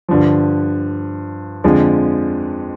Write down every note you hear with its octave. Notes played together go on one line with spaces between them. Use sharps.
G2 D3 F3
F2 D3 F3 G#3